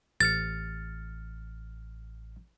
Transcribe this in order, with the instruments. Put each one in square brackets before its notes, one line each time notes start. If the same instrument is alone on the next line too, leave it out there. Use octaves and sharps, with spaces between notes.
[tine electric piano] A1 F6 C#7 [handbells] A6